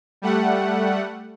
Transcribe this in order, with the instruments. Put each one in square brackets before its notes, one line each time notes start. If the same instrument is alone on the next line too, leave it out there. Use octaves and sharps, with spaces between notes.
[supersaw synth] G3 A3 F#5